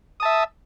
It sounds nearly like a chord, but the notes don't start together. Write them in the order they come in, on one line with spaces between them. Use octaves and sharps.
D#6 A5 E5